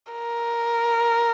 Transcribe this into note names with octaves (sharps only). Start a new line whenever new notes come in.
A#4